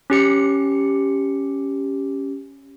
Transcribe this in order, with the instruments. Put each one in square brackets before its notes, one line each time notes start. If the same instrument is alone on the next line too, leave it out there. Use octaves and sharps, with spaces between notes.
[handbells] C#4 G4 C#7